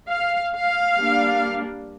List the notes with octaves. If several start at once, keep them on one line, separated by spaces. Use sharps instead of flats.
F5
F5
G3 A#3 D4